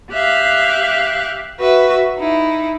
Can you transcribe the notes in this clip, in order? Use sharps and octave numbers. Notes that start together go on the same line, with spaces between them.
G4 E5 F5 F#6
F#4 B4 E5
D#4 E4